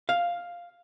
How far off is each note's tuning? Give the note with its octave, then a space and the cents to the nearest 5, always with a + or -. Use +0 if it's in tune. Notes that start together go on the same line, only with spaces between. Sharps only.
F5 +0